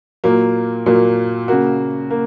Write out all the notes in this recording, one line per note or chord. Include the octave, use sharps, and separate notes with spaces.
A#2 F#3 A#3
A#2 F#3 A#3
C#3 A#3 F#4
A#3